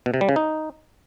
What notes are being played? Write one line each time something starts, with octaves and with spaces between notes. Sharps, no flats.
B2
C3
G3
C#3
D#4